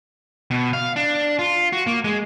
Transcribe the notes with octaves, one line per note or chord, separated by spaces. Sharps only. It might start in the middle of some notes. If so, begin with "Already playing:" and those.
B2
F5
D4
F4
F#4
A#3
G#3